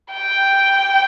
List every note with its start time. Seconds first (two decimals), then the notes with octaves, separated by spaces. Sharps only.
0.12 G5